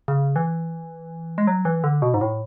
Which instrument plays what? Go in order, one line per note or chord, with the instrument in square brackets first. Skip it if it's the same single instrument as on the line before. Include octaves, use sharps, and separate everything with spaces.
[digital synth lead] C#3
E3
G#3
F#3
E3
D3
B2
G#2
A2